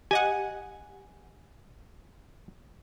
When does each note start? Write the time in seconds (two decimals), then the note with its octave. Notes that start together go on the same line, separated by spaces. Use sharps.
0.11 G4 D#5 F#5 G#5